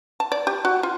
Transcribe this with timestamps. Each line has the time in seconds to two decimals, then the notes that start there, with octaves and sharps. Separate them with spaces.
0.20 A5
0.32 D5
0.47 G4
0.65 F#4
0.83 F4